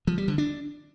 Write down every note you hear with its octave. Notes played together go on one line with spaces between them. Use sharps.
F3
G3
D3
D4